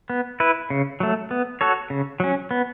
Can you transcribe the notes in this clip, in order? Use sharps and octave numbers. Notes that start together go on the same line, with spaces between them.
B3
E4 B4
C#3
F#3 A3
B3
F#4 A4 C#5
C#3
F#3 C#4
B3